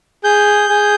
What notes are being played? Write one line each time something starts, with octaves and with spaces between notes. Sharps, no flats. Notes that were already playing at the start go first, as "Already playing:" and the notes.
G#4 G6
G#4